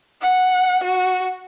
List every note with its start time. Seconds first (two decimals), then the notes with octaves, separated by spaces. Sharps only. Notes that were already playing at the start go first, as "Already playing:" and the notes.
0.22 F#5
0.84 F#4